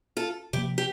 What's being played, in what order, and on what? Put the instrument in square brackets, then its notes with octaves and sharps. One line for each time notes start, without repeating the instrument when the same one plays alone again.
[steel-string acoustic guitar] F4 A4
[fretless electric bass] C3 F3 A#3 [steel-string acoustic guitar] E4 G4
[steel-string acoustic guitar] G4